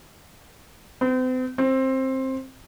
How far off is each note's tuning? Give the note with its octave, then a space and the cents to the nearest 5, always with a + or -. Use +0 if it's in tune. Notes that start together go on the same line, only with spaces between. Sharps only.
C4 -40
C4 +15